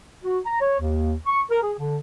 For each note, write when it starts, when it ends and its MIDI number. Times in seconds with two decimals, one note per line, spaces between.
0.24 0.38 66
0.45 0.59 82
0.61 0.78 73
0.80 1.14 39
1.27 1.41 85
1.50 1.61 70
1.62 1.72 68
1.78 1.96 50